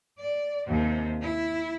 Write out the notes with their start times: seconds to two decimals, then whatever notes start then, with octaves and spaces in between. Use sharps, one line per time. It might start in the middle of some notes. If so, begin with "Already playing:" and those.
0.18 D5
0.68 D#2 C3
1.22 E4